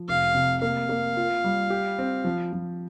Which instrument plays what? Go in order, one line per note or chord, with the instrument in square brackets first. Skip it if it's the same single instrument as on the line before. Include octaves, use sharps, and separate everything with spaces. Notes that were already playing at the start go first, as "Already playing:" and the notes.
Already playing: [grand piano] F3
[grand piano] F1 [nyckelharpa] F5
[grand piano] C3
[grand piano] A#3 [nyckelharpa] F5
[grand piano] A#3
F4
G3
G4
C4
F3
F3